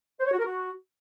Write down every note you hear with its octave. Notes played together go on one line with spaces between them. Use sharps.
C5
C#5
F#4
A#4
F#4